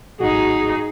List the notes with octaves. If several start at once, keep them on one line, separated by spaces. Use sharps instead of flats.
D1 G#1 D#4 F#4 G#4